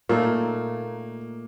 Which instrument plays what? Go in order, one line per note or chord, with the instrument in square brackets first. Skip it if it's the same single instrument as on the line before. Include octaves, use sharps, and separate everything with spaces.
[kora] A#2 A3 D#4 [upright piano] A#3